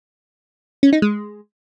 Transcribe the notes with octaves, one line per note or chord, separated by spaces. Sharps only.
C#4
D#4
G#3